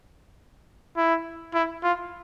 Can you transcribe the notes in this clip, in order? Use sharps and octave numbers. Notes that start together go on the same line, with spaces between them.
E4
E4
F4